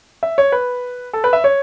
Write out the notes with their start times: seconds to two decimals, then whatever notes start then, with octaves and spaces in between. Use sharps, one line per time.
0.23 E5
0.38 C#5
0.52 B4
1.13 A4
1.24 B4
1.33 E5
1.44 C#5